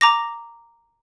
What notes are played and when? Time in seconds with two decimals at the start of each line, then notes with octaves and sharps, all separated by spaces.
0.01 A#5 D6 A#6